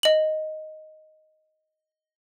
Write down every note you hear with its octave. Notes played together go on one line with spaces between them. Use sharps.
D#5 F#7